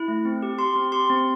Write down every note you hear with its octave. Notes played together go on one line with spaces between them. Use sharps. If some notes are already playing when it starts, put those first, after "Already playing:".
Already playing: E4
A3
C4
G4
G4 C6
C4
G4 C6
C4